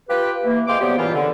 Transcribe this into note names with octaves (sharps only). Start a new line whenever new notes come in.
F4 G4 B4
E3 A#3
F2 G#3 F5 G5 C6 D6
C3 F#3 G3 B3 G4
G2 A#2 C#3 E3 E4 F4
D3